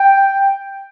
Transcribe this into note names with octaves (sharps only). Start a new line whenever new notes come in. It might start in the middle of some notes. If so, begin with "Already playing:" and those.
Already playing: G5